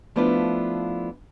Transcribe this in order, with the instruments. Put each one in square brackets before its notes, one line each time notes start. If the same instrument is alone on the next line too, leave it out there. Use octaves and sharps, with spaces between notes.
[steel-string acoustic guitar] F3 A3 B3 D4 E4 F4